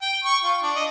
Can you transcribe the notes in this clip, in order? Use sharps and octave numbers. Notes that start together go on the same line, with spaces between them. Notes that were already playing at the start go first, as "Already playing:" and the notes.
G5
C#6
F4
D4
D#5